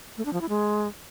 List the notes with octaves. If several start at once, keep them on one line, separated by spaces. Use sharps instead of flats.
A3
D4
F3
E4
G#3